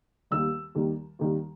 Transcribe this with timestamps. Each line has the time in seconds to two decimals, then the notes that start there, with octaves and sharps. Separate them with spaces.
0.31 D#2 D#3 G3 E6
0.75 D#2 D#3 G3
1.19 D#2 D#3 G3